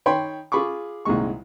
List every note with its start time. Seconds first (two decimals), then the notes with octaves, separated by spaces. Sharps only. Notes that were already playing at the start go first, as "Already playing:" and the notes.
0.06 D#3 C#5 G5 B5 C6
0.52 F4 G#4 B5 C#6 D6
1.05 C2 A#2 D#3 G#3 C#6